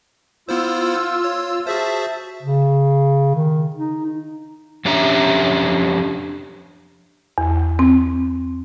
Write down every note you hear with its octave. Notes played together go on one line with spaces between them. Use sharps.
B3 E4 F4 C5 E6
C#5
F#4 G#4 C5 E5 A5
C#3
D#3
D#4
F2 C#4 D4 G4 E5 A#5
E2
C4